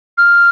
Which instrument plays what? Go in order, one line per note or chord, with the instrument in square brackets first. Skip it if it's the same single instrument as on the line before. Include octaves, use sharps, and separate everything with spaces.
[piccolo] F6